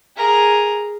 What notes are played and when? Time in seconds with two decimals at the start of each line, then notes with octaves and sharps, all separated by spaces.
0.17 G#4 A#4